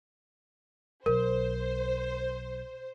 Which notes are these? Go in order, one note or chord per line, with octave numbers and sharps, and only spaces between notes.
B1 A#4 C5